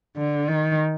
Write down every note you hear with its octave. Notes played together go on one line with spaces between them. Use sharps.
D3
D#3